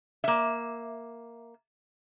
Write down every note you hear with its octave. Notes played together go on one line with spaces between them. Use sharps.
A#3 E5